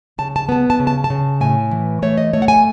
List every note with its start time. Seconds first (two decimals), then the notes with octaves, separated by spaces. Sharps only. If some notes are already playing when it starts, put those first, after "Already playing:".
0.18 C#3 A5
0.36 A5
0.49 B3 A5
0.70 A5
0.79 C#3
0.87 A5
1.04 A5
1.10 C#3
1.41 A2 G#5
1.71 E3
2.02 A3 C#5
2.17 D#5
2.33 A3 C#5
2.42 F#5
2.48 G#5